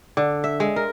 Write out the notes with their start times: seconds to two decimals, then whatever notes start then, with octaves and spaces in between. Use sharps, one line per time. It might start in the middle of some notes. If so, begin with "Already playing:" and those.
0.17 D3
0.44 E5
0.60 G#3
0.76 A#4